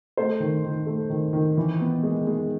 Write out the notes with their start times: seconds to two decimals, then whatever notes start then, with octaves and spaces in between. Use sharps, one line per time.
0.17 A3 C5
0.40 D#3
0.64 D#3
0.87 A3
1.10 D#3
1.33 D#3
1.57 E3
1.80 B3
2.03 G#3
2.27 G#3